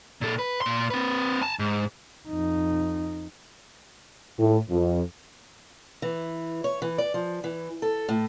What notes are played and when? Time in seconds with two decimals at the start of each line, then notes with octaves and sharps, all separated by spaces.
0.21 A#2 A4
0.39 B4
0.62 A#2 C6
0.90 C4 B4
1.42 G#5 A5
1.59 G#2
2.28 F2 D#4
4.38 A2
4.70 F2
6.02 E3
6.64 C#5
6.82 E3
6.98 D5
7.14 F3
7.44 E3
7.82 A4
8.09 A2